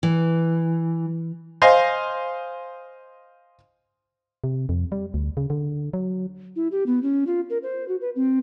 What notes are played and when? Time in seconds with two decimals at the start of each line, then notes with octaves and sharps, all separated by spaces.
0.03 E3
1.62 C5 D#5 F5 G#5
4.44 C3
4.69 F2
4.92 G3
5.14 D2
5.37 C#3
5.50 D3
5.93 F#3
6.56 E4
6.72 G4
6.86 B3
7.03 C#4
7.27 F4
7.50 A#4
7.63 C5
7.88 F#4
8.01 B4
8.15 C4